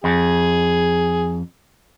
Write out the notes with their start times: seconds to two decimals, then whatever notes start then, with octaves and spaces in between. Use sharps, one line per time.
0.04 F2 G#4